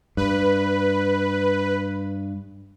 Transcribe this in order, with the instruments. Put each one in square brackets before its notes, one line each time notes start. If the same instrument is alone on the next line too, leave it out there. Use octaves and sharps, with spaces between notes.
[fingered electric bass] G2 [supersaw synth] B4